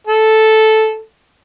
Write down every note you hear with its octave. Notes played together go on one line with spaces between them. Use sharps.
A4